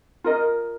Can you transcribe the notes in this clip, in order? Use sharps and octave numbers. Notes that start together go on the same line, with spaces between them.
F4 A#4 D#5